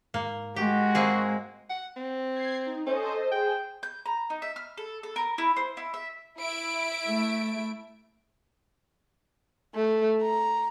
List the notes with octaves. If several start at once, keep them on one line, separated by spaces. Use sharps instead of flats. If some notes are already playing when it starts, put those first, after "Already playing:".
G#2 A#3
G#3 F#4 G4
A#3 C4 G#4
F#5
C4
G#6 C7
D#4
C#4 A4 C5 D#5
G#4 C5 G5
G6
A#5
D#4
E5
F6
A4
A4
A#4
E4
C5
E4
E5
E4 E5 D7
A3
A3
A#5